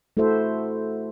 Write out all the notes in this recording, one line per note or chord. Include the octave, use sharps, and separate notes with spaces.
A3 E4 F#4 A4 C5 E5